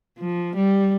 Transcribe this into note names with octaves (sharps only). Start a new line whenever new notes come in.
F3
G3